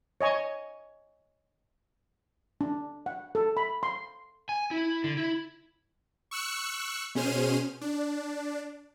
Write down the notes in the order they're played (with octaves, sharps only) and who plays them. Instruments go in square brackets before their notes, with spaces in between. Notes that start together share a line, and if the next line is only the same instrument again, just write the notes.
[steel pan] C#5 D#5 G#5 C#6
D4
F#5
A4
B5
C6
[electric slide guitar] G#5
E4
D3
E4
[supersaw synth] C#6 E6 F#6 C#7
B2 C#4 G#4 C5 F6 D#7
D4